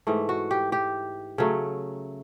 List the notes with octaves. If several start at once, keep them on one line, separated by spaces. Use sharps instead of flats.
G#2 E3 A3
F#4
G4
G4
C#3 F#3 A3